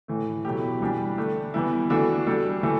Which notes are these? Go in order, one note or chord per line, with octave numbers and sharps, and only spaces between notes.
A2 E3 A3
B2 F#3 A3 E4 G4
E3 G3 D4 G4
D3 A3 D4
E3 G3 B3 E4
E3 A3 D4 F#4 A4
G3 D4 F#4 A4
E3 A3 E4 A4